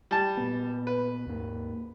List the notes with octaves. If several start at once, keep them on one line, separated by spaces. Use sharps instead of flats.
G3 A5
A#2 B3
B4
D#2 G#2 A#3